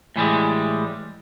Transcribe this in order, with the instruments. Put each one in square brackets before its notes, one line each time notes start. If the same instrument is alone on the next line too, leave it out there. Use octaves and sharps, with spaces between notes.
[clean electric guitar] A2 E3 G3 G#3